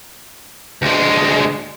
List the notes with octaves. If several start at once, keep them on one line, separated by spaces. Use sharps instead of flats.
D2 G#3